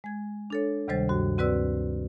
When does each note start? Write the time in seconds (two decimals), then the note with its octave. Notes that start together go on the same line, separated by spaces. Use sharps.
0.04 G#3 G#6
0.50 D4 A4 C#5
0.88 D2 C3 D#3 G3 C5 A6
1.09 G2 F#4
1.38 D2 C4 F#4 B4 D5 E6